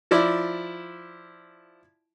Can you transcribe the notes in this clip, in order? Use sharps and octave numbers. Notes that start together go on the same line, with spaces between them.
F3 E4 D5